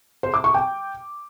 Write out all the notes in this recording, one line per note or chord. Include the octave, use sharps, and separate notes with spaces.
C5
D6
C#6
G5